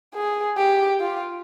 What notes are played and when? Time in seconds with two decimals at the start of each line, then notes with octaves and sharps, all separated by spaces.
0.15 G#4
0.58 G4
1.01 F4